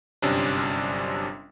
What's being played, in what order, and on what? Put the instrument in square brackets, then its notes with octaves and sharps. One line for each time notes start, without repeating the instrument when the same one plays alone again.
[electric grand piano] G1 F#2 C3 G3 C#4 D4